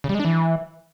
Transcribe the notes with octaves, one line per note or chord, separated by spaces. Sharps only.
C#3
G3
G#3
D4
E3